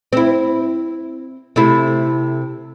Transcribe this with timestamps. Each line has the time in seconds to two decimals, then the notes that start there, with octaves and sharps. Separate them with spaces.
0.13 C4 E4
1.56 C3 A3 E4